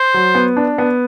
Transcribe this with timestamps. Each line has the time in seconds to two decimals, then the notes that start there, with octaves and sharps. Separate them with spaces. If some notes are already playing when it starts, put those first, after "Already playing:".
Already playing: C5
0.14 F#3
0.35 B3
0.57 D4
0.78 B3